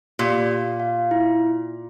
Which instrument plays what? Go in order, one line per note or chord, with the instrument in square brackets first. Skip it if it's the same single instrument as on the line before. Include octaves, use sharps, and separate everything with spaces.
[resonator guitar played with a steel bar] A#2 [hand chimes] G4
[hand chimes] F5
F5
E4